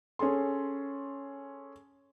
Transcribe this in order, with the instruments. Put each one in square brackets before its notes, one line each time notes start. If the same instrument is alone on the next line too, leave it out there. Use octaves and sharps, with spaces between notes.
[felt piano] C#4 G#4 A4 C6